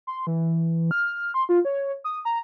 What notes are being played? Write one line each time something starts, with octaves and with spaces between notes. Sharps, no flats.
C6
E3
F6
C6
F4
C#5
D#6
A#5